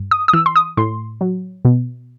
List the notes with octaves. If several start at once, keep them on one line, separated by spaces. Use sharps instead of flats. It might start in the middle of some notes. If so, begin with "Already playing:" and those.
Already playing: G2
D#6
D#6
E3 E6
C6
D#6
A2 C6
F#3
B2